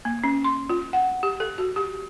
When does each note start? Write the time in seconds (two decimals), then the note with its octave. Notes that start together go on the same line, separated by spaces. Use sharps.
0.05 A#3
0.24 C#4
0.44 C6
0.70 F4
0.93 F#5
1.23 G4
1.40 A4
1.58 F#4
1.76 G4